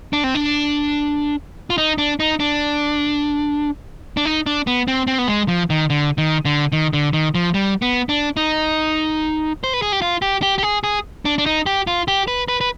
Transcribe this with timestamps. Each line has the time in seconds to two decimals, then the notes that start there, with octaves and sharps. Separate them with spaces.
0.13 D4
0.24 C4
0.35 D4
1.70 F4
1.78 D#4
1.98 D4
2.20 D#4
2.40 D4
4.17 D4
4.25 D#4
4.46 D4
4.67 B3
4.88 C4
5.07 C4
5.19 B3
5.28 G#3
5.48 F3
5.70 D#3
5.90 D3
6.18 D#3
6.45 D3
6.72 D#3
6.93 D3
7.13 D#3
7.35 F3
7.54 G3
7.82 B3
8.09 D4
8.37 D#4
9.64 C5
9.74 B4
9.82 G#4
9.92 G4
10.02 F4
10.22 G4
10.42 G4
10.58 G4
10.63 G#4
10.84 G#4
11.25 D4
11.38 D4
11.46 D#4
11.66 G4
11.87 F4
12.08 G4
12.28 B4
12.48 B4
12.61 B4